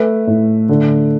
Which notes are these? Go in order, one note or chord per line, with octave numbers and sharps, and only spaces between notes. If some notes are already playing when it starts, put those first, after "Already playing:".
Already playing: A3 B4 E5
A2
D3